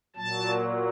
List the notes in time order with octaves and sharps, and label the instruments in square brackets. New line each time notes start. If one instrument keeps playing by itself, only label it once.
[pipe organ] A#2 F#3 A5